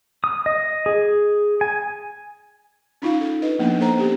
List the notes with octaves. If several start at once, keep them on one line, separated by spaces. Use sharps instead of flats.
D#6
D#5
G#4
G#5
C#4 D#4 F4 F5
A4
D4 D#4 B4 D#5
F3 A#3 B3 D4
A#3 A4 C5 A#5
B3 C#4 G4